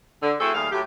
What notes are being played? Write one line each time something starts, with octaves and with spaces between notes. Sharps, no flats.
D3
A3 C4 E4 F#4 G#4 A4
D#2 G3 A3 G#4 F5
A2 F#3 A3 G4